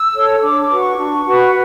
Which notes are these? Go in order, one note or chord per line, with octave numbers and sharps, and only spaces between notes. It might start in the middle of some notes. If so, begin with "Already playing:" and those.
Already playing: E6
A4 C#5
D4 D6
D6
F#4 B4
C#6
D4
F#4 B4